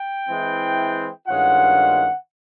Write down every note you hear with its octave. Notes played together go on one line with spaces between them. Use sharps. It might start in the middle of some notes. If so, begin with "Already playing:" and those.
Already playing: G5
E3 G#3 C4 E4
G2 D#3 G#3 C#4 F4 F#5